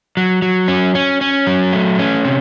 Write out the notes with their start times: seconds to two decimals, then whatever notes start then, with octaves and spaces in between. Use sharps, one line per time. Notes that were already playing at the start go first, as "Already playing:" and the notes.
0.17 F#3
0.42 F#3
0.68 C#4
0.95 C#4
1.21 C#4
1.47 F#3
1.73 A3
1.99 C#4
2.25 C3